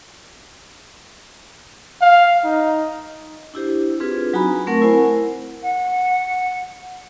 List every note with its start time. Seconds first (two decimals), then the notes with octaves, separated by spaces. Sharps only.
2.02 F5
2.44 D#4
3.54 D4 E4 G4 C5
4.00 C4 D4 F4 G#4 B4
4.33 F#3 D#4 F#4 G#5 A#5 B5
4.67 A3 C4 A#4 F#5 C#6
4.82 E4 A#4 C5 G#5
5.62 F#5